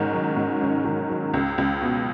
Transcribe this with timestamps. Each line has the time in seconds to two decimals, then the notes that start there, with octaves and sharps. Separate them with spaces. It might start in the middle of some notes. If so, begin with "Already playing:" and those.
Already playing: G#2 D#3 C#4
0.13 F#3
0.36 G#2
0.61 C#4
0.85 D#3
1.09 F#3
1.34 C#2
1.58 C#2
1.82 B2